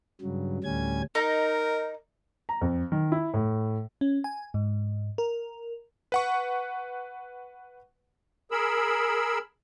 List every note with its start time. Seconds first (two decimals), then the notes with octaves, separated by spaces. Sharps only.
0.21 G2 C#3 F#3
0.64 D2 A2 G3 C#4 G#5 G#6
1.15 D#4 A#4
2.49 A#5
2.62 F2
2.92 D#3
3.12 E4
3.34 A2
4.01 C#4
4.24 G#5
4.54 G#2
5.18 A#4
6.12 B4 F#5 C#6
8.51 G#4 A#4 B5 E6